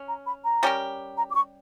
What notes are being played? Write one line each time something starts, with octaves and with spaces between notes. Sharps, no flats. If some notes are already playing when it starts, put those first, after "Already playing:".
Already playing: C#4
A#5
B5
A#5
G3 C#4 G4 A#4
A#5
D6
C#6